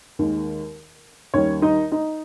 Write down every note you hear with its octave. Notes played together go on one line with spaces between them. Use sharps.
D#2 D#3 G#3
D#2 D#3 G3 C#4 C#5
D#4 D#5
D#4 D#5